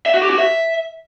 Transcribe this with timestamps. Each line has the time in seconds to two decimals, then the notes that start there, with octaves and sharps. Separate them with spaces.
0.06 E5
0.14 F#4
0.22 G4
0.30 F#4
0.38 E5